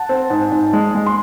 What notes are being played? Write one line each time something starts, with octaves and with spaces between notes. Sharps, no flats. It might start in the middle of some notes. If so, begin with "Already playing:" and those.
Already playing: F#5 A5
C4
G#2
G#2
G#3
G#3
C6